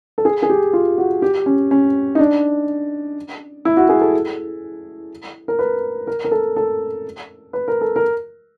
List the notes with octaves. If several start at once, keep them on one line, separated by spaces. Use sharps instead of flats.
A4
G#4
G#4
G4
F4
F#4
G4
C#4
C#4
D#4
D4
E4
F#4
G#4
A4
A#4
B4
A#4
A#4
A4
A4
B4
A#4
A4
A#4